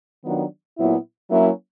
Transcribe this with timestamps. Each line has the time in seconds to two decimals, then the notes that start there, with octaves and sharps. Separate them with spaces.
0.25 D#3 F#3 B3 D4 F4
0.78 A#2 F#3 B3 E4
1.31 F#3 A#3 C#4 E4